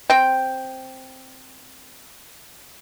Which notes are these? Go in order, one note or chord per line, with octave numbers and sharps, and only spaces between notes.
C4 G5